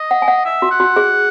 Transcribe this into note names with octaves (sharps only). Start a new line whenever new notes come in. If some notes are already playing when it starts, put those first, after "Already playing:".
Already playing: D#5
F#5
G#5
F#5
E5
F#4
F#5
F#4
G#4